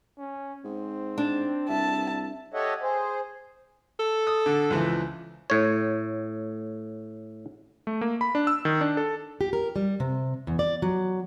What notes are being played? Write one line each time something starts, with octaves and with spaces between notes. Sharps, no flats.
C#4
G#2 C4
D4
C2 E5 A5
G4 A4 C#5 D#5 E5 F#5
G#4 C5
A4
D#6
D3
C#2 E3 F3
A2 C#5
A3
A#3
B5
D4
E6
D#3
D4
A4
G4
A#4
G3
C3
E2
D5
F#3